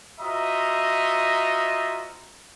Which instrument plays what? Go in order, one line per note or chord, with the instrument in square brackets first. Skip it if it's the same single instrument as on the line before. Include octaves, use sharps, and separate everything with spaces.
[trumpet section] F4 F#4 C5 D#5 E5 A#5